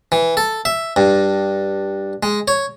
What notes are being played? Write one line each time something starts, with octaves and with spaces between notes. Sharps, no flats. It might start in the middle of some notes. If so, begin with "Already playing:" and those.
E3
A4
E5
G2
G#3
C#5